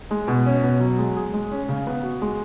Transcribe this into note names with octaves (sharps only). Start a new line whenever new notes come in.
G#3
B2
C#4
B2
F#3
G#3
G#4
G#3
C#4
C#3
B3
F#4
G#3